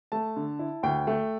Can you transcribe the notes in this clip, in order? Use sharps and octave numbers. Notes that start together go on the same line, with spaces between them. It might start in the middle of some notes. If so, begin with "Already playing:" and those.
A3 A5
D3
E4
D2 G5
A3